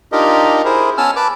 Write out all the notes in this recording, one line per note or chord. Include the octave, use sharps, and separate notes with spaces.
D4 D#4 F4 G4 A#4 D#5
E4 G#4 A#4 C5
B3 C#4 G#5 A5 E6 F6
B4 A5 D6